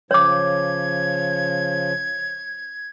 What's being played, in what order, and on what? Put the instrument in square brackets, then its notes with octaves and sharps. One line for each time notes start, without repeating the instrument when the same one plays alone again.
[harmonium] C#3 F3 [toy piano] C#5 D6 [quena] G#6